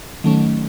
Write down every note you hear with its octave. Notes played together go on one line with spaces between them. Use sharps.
D#3 F#3 A3 C#4